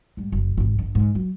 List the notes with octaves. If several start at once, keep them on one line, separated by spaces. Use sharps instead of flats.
G#2 G3
F#1
G#1 C3
G1 D3
G#2
F#3